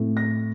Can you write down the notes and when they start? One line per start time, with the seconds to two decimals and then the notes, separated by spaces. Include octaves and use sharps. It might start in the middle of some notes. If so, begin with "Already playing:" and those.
Already playing: A2 A3 C4
0.17 A#6